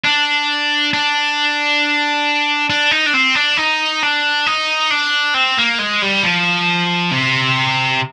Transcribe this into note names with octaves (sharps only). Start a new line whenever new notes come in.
D4
D4
D4
D#4
D4
C4
D4
D#4
D4
D#4
D4
C4
A#3
G#3
G3
F3
C3